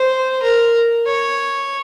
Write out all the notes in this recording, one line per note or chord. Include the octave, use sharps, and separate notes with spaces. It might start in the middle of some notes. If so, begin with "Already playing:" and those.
Already playing: C5
A#4
C#5